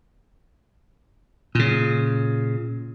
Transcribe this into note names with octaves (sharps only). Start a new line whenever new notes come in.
A#2 C#3